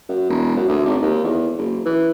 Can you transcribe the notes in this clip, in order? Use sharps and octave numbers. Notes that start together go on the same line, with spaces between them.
F#2
E1
F#2
D2
G#1
D#2
E2
F#1
E3